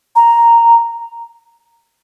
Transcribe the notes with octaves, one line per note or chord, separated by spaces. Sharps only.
A#5